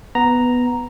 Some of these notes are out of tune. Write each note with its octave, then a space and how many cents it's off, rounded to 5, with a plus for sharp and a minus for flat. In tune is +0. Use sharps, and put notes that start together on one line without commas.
B3 +0 A#5 +0